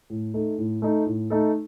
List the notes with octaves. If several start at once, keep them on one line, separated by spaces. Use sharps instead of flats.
A2
A3 D#4 A4
A2
A3 D#4 A4
A2
A3 D#4 A4